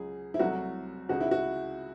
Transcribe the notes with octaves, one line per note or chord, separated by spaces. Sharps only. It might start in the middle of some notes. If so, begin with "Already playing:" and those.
Already playing: C#2 C#3 F#3 G#4
E4
C2 C3 F#3 A3 F#4
C#2 C#3 G#3 F#4
E4
F#4